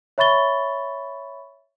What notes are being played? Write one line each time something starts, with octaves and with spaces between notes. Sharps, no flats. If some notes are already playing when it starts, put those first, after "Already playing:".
C#5 E5 B5 C#6 A6 G7